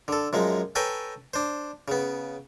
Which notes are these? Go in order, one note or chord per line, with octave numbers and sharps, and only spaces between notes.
D3 A4
F#2 F3 G#3
A4 B4 C#5 G5 G#5 A#5
D4 C5
C#3 B3